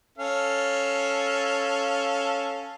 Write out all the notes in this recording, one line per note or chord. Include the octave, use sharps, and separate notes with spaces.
C#4 A4 F5